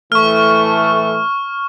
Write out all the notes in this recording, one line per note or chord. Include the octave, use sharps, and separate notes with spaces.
A2 E3 A3 C#6 F6